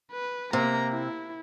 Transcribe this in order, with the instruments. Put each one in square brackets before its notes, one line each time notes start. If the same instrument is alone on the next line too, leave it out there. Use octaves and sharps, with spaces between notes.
[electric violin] B4
[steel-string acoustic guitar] C3 [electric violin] A#3 A#5
[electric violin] E4